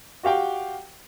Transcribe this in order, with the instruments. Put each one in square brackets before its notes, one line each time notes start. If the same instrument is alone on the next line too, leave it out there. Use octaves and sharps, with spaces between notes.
[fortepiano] F#4 G4 F5 G5